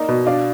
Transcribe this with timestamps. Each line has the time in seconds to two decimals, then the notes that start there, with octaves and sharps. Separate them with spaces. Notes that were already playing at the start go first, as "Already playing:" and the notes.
Already playing: A#3 D#4 D5
0.09 B2
0.26 D4 D5 F5